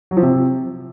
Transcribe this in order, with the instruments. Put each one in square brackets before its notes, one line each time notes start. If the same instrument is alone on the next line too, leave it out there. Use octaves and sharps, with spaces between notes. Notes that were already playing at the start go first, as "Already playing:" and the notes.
[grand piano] F#3
F3
C3